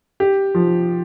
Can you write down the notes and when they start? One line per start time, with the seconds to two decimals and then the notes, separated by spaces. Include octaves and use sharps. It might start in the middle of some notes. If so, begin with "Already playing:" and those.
0.20 G4
0.54 F3